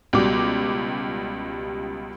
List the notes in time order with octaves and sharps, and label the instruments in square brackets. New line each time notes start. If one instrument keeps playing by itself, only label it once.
[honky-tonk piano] C#2 B2 G3 D6